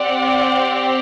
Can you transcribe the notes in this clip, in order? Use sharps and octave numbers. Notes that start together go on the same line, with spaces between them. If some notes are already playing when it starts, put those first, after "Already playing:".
Already playing: C4 G4 D5 F#5